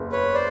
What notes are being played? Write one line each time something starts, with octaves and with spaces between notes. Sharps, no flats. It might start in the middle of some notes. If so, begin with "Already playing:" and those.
Already playing: F#1 E2
B4 C#5
C5 D5